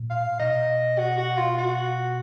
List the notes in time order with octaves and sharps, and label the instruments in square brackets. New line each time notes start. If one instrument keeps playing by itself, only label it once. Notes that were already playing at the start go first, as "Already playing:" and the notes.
Already playing: [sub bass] A#2
[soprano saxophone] F5
[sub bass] B2 [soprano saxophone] D#5
[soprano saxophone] F#4
F#4
F4
F#4